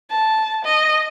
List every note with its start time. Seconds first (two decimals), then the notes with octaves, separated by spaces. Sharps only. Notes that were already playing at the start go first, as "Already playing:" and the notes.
0.11 A5
0.65 D#5